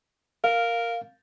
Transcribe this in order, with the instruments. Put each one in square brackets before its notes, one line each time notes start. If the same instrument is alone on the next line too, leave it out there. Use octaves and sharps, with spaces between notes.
[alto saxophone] A#4 [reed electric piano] F5